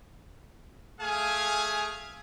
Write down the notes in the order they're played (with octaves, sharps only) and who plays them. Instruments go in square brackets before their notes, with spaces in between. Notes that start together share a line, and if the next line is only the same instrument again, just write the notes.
[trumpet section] A3 G#4 F5 G#5